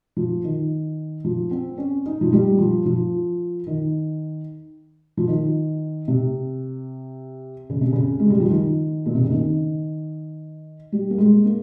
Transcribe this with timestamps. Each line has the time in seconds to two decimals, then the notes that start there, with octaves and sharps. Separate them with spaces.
0.17 F3
0.44 D#3
1.24 F3
1.51 C4
1.78 C#4
2.06 D#4
2.21 F3
2.32 G3
2.59 F3
2.86 F3
3.67 D#3
5.17 F3
5.28 D#3
6.08 C3
7.70 C#3
7.81 C3
7.93 C#3
8.20 G#3
8.30 G3
8.40 F3
8.49 D#3
9.06 A#2
9.14 C3
9.23 C#3
9.31 D#3
10.92 G3
11.10 A#3
11.18 G#3
11.45 A#3